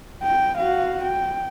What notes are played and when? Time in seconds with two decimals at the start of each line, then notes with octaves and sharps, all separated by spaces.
0.23 G5
0.58 F#4 F5
1.03 G5